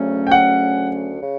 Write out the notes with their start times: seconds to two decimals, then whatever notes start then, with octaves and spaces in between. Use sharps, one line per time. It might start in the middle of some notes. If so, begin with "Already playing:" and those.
Already playing: D2 C#3 F#3 A3 C#4
0.27 G5
0.31 F#5
1.22 C#3